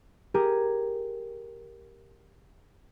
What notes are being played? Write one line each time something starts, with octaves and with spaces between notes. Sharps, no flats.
G4 G#4 A#4